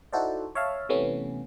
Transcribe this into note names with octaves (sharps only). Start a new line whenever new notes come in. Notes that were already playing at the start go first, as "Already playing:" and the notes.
D#4 E4 F#4 A4 C5 D5
C#5 E5 F5 A5
C3 E3 A3 B3 C#4